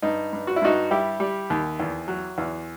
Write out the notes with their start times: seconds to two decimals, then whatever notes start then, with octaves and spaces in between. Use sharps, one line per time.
0.02 G2 D#4
0.33 G2
0.47 F#4
0.56 E4
0.62 G2 D#4 F#4
0.91 G3 E4 G4
1.20 G3
1.50 D#2
1.80 E2
2.08 F#3
2.38 E2